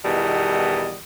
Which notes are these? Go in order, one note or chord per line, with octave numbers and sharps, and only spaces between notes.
E2 B2 D#3 E3 G3 D#5